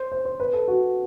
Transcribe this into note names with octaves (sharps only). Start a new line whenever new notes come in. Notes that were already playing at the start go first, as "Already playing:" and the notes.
Already playing: C5
C5
C5
B4
A4
F#4